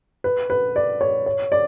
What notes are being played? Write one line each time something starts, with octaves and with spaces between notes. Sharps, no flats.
B4
B4
D5
C#5
C#5
D5